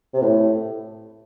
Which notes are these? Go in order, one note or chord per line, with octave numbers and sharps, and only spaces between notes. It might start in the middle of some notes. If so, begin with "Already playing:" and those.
C3
A2